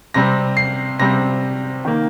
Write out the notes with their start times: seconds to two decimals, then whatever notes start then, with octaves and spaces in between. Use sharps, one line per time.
0.14 C3 G3 C4 A#6
0.57 C7
0.99 C3 G3 C4 A#6
1.85 D#3 A#3